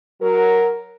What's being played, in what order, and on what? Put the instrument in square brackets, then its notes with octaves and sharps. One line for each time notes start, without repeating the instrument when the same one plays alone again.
[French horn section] F#3 A#4